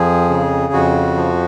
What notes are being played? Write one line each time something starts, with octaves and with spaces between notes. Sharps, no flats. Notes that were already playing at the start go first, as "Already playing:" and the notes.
Already playing: F2 F3 G#4
C#3
F2 F#4
F3